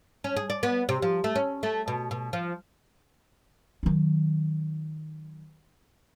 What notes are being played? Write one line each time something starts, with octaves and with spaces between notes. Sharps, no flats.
C#4
G#4
D5
B3
C3
F3
A3
C#4
A3
B2
B2
F3
D#3 F#3